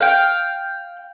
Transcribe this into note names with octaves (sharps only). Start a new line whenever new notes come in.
F5 G5